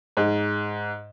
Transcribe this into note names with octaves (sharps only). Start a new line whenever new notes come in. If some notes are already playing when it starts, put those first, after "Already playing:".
G#2